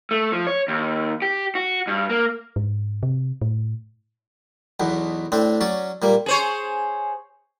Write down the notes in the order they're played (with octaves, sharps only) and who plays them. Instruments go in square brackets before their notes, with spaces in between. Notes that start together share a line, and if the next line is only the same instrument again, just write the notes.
[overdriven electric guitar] A3
F3
C#5
D#2
G4
F#4
G2
A#3
[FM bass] G#2
C3
A2
[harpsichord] B1 E2 B2
A2 C4 D4
F#3 C#4 D5
A#2 G3 A#3
[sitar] G#4 C5 C#5